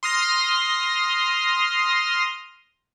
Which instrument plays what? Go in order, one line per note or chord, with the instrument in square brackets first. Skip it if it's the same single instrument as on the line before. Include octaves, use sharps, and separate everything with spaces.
[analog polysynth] C6 D#6 F6 A#6